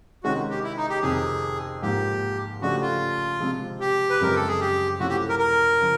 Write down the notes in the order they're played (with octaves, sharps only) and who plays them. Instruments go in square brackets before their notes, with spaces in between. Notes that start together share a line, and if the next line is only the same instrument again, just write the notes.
[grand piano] C3 D#3 G#3 C#4 [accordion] F#4
[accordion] G4
E4
D#4
G4
[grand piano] F2 C3 D#3 [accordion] G#4
[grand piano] G#2 F3 A#3 [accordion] G4
[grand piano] C#3 F3 A3 D4 G4 [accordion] F#4
[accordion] F4
[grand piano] C3 F3 G#3 C4
[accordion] G4
B4
[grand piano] F#2 C#3 F3 G#3 C4 [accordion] A#4
[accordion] A4
G#4
G4
[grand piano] C3 F3 A3 C#4 E4 [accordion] F#4
[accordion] G4
A#4
A#4
[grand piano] C#3 F3